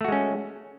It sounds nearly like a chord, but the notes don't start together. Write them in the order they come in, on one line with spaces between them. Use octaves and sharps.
A3 F#4 G#3 C#4